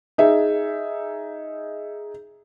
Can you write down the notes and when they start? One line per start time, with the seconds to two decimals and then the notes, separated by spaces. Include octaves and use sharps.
0.18 D#4 G#4 E5